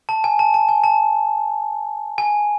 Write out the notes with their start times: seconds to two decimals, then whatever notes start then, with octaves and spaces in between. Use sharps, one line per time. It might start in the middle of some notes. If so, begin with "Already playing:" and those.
0.09 A5
0.24 G#5
0.39 A5
0.54 A5
0.69 G#5
0.84 A5
2.18 G#5